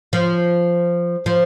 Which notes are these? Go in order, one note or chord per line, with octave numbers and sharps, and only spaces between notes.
F3
F3